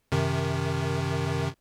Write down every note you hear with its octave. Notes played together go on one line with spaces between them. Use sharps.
F#2 C3 D#3